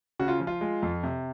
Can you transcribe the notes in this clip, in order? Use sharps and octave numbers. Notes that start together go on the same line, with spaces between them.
C#3 F#4
F4
F3
F4
G#3
F2
C3